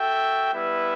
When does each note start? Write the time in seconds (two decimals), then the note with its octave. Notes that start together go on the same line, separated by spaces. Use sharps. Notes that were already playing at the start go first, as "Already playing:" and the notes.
Already playing: F#4 A4 E5 G5
0.51 G3 B3 E4 B4 E5